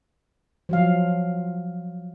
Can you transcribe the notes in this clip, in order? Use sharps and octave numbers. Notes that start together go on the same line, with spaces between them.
F3 F#3 F5